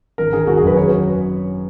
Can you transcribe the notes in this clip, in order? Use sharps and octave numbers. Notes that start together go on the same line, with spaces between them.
G#1 A#4
D#3 G#4
G#1 F#4
G#4
F#2 B4
C#5